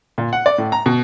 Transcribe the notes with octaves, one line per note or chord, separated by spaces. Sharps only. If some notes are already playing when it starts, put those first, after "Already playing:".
A#2
F#5
D5
A2
A#5
B2